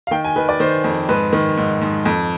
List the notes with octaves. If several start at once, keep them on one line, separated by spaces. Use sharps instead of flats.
F5
D#3 G5
G#5
D#3 B4
D5
D#3 C5
F2
G#2 B4
D#3
G#2
G#2
F2